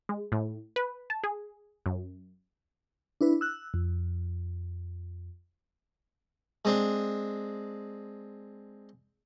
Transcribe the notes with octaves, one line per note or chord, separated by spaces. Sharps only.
G#3
A2
B4
A5
G#4
F#2
D4 E4 B4
E6 F#6
F2
G#3 C4 D4